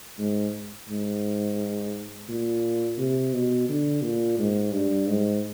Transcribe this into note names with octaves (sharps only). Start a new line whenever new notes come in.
G#2
G#2
A#2
C3
B2
D3
A#2
G#2
G2
G#2